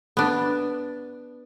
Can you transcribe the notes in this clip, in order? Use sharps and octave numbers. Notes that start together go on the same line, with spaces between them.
B3 D4